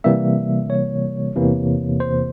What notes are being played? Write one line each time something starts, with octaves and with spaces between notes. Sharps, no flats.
C3 E3 G3 A#3 E5
C#5
E2 C3 E3 A#3
C5